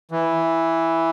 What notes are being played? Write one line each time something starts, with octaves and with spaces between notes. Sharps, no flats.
E3